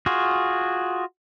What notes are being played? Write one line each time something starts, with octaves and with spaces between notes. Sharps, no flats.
F4 F#4 G#4